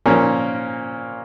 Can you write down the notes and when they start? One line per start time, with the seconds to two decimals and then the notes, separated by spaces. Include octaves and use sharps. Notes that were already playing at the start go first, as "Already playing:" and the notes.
0.06 A#2 F3 A#3 C#4